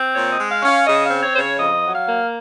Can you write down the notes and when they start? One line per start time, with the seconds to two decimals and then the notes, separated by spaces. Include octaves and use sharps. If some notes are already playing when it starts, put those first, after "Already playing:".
Already playing: C4
0.14 A#2 C#5
0.33 D#5
0.38 G#3
0.51 F5
0.63 C#4 F5
0.86 C#3 D#5
1.05 F5
1.10 C4
1.23 C#5
1.34 C#3 C5
1.41 C#5
1.58 F2 D#5
1.83 F#3
1.95 F5
2.08 A#3